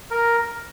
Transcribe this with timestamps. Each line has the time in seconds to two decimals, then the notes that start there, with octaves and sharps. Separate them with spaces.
0.11 A#4